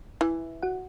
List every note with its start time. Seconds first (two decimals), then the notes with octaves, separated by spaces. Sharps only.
0.21 E3 E4 E5
0.62 F#4 F#5